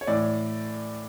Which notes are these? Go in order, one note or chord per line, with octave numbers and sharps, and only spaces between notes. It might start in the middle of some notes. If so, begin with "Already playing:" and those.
C#5
A2 E3 D5